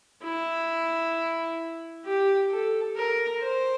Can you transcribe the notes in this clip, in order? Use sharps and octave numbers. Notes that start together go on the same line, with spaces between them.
E4
G4
A4
A#4
C5